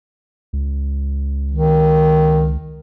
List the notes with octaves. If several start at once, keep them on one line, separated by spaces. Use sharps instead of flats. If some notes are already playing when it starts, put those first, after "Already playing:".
C#2
D#3